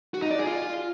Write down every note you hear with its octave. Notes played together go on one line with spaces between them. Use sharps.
F#4
D#4
D5
G#4
F4